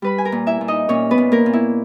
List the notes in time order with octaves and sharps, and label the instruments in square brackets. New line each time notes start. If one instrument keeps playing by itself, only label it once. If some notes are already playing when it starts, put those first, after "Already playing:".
[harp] G3 B4 B5
G#5
A#4 A#5
A#2
E4 E5
A#2
D#4 D#5
A#2 C#4 C#5
B3 B4
A#2
A#3 A#4
A#2
E4